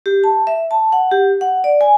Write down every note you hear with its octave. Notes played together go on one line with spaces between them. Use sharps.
G4
A5
E5
A5
F#5
G4
F#5
D5
G#5